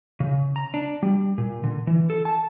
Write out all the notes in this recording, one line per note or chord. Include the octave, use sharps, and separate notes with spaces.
C#3
A#5
D4
G3
A#2
D3
E3
A4
A5